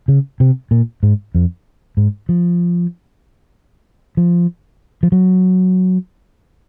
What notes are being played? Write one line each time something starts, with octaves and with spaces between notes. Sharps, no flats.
C#3
C3
A#2
G#2
F2
G#2
F3
F3
F3
F#3